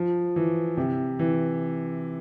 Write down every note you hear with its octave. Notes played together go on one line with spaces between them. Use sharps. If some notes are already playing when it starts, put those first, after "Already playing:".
Already playing: F3
E3
C3
E3